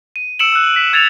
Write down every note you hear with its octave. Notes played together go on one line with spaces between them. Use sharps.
D#7
E6 C#7 D7 E7 F#7
E6 F#6
B6
E6 G#6 A6 C#7 F7